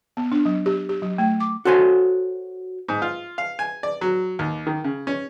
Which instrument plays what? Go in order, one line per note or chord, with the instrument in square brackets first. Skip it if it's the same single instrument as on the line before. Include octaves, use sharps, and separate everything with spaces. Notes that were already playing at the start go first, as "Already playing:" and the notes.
[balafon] B3
D4
F#3
G4
G4
F#3
A3
D6
[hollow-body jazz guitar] F#4 A4 C5 C#5 G#5
[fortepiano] G#2
F4
F5
G#5
D5
F#3
D#2
D#3
C#3
C#4